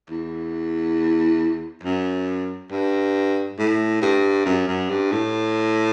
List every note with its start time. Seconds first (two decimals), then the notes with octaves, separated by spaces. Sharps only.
0.10 E2
1.84 F#2
2.71 G2
3.59 A2
4.02 G2
4.46 F#2
4.68 F#2
4.90 G2
5.12 A2